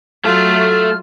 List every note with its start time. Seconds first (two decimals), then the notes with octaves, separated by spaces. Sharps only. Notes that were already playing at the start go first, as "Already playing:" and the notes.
0.25 F#3 A3 F4 A4 F6